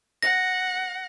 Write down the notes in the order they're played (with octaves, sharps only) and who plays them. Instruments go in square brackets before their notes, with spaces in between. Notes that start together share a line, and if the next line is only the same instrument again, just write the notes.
[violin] F#5 [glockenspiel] A#6